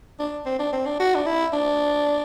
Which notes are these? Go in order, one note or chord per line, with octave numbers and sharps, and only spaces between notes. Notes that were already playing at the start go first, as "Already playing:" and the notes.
D4
C4
D4
C4
D4
F#4
D4
E4
D4